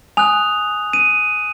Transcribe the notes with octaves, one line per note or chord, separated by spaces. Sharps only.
G#5 D#6 F#6 F7
D#7